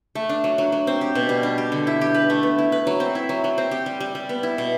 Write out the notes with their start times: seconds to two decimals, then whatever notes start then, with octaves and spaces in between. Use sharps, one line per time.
0.15 A3
0.29 D4
0.44 F#3
0.58 F#3
0.72 F#3
0.87 C4
1.01 G4
1.15 B2
1.29 G3
1.43 D4
1.58 G4
1.72 D3
1.87 E4
2.01 G4
2.14 B4
2.30 A3
2.43 B3
2.58 E4
2.72 B4
2.87 F#3
3.00 C4
3.15 E4
3.29 F#3
3.44 F#3
3.58 C4
3.71 G4
3.86 G3
4.00 G3
4.15 G3
4.29 B3
4.43 E4
4.58 B2